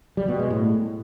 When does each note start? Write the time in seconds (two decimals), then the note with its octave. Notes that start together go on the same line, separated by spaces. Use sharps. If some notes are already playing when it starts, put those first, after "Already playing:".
0.17 G3
0.28 B2
0.39 G#3
0.50 A2